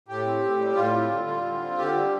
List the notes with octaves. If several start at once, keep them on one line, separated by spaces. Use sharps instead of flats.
A2 G4
C4
A2
G3
A2 F4
C4
D3
G3
D3
C4
D3 G4
G3